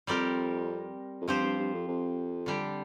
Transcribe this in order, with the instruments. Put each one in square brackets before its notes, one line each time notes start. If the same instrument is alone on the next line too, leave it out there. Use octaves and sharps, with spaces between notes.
[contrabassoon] F2 [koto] G3 C4 G4 A#4 D5
[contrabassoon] F2
[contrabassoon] G2 [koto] F3 C4 G4 C5
[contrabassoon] G2
G2
F2
F2
[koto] D3 G3 D4 G4